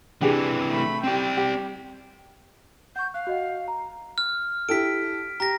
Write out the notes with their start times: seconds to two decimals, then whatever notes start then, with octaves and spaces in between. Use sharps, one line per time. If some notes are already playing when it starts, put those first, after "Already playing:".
0.21 C3 E3 D4 G4 G#4
0.69 A3 B5
1.04 C4 G4 D5 G5
1.37 G3 G4
2.96 F#5 C#6 G6
3.14 F5 F#6
3.27 F#4 D#5 F#5
3.68 A#5
4.18 F6
4.69 E4 G4 A4 B6 D7
5.40 G4 A#5 A#6